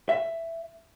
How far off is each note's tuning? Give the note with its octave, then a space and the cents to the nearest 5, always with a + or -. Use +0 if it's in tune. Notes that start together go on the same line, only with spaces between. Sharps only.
E5 +10